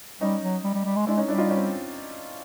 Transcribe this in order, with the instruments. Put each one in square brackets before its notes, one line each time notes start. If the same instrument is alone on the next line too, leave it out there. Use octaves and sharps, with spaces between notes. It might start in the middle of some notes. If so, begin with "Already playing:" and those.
[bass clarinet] G3 [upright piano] C#4 D#4
[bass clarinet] F#3
G3
G3
G3
G#3
[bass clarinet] G#3 [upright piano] D4 E4
[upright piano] C#4 D#4
[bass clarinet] G3 [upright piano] D4 E4
[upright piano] D#4 F4
C#4 D#4
C4